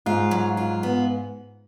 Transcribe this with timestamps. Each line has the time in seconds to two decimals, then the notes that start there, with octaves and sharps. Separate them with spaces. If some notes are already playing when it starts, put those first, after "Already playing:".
0.06 G#2 F4
0.31 F#3
0.57 F4
0.83 B3